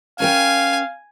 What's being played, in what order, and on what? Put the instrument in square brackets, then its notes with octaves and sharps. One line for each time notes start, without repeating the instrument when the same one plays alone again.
[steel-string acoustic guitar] C#4 A#4 G5 [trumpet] F5 [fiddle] G#5